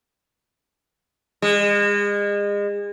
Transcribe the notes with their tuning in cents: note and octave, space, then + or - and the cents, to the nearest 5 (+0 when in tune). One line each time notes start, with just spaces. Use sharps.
G#3 -35